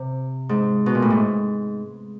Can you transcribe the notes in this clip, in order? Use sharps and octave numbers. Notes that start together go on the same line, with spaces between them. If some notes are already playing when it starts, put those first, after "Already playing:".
Already playing: C3
G#2
B2
A#2
A2
G#2